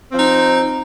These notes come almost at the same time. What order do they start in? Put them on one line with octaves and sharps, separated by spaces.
C4 F3 D#4